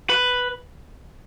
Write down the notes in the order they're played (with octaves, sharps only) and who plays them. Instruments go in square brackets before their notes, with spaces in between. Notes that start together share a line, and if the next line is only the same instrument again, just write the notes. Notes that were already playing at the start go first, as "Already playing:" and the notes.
[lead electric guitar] B4